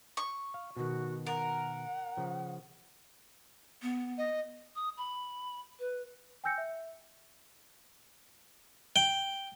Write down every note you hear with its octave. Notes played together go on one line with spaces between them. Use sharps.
C#6
F5
B2 D#3 F#4
A#4 F#5
C#3 F3
B3
D#5
D#6
B5
B4
G5 G#5 E6 G6 A#6 C#7
E5
G5